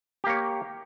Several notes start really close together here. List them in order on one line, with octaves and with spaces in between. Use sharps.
G4 A#3 C#5